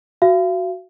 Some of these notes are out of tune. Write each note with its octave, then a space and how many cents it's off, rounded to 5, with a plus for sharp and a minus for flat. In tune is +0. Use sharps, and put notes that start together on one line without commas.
F#4 +0 F5 -40